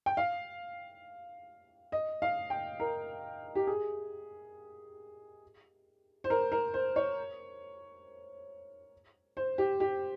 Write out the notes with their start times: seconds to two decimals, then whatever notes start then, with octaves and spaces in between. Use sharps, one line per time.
0.06 G5
0.17 F5
1.92 D#5
2.22 F5
2.50 G5
2.80 A#4
3.55 G4
3.67 G#4
6.24 C5
6.30 A#4
6.52 A#4
6.74 C5
6.96 C#5
9.37 C5
9.58 G4
9.80 G4